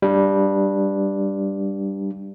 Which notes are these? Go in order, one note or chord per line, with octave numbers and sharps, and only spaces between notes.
G3 D4